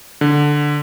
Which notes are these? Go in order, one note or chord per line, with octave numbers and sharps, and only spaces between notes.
D3